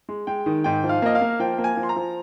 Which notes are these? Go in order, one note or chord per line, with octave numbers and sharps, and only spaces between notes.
G#3
G#3 G5
D#3
G#2 G5
F3
F5
A#3 D#5
F5
A#3
F3 G5
A#3
G#5
F3
C6
A#5
F3